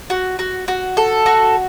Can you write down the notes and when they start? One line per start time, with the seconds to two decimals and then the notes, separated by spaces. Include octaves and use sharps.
0.10 F#4
0.39 F#4
0.68 F#4
0.97 A4
1.26 F#4